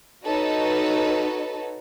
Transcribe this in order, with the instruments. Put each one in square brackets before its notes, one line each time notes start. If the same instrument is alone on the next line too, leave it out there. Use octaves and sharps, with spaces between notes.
[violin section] D#4 F#4 A4 B4 C#5